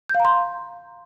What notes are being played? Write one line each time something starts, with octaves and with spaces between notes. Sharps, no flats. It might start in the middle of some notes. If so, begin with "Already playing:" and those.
G6
F5
A#5
C6